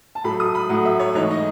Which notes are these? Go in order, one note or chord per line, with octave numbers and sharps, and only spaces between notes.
A5
A2 F#3 A3 B5
D#6
B5
A2 F#3 A3 F#5
E5
C#5
G#2 E3 G#3 C#5
D#5